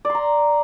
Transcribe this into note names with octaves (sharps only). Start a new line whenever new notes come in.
D5 A#5 C6